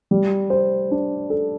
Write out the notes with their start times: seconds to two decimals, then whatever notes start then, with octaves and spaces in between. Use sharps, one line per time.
0.11 G3
0.50 C5
0.91 D4
1.30 A4